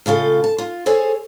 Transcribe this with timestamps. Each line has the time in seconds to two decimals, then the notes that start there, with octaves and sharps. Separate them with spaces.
0.06 A2 C#3 F4 A4
0.44 A5
0.58 F4
0.86 G#4 A4 C5 C#5 G#5